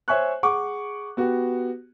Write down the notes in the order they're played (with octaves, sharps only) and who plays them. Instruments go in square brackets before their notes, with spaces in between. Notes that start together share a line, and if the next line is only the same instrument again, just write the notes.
[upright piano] C5 C#5 E5 G#5 C#6 F#6
G#4 F#5 C#6 D6
B3 F#4 G4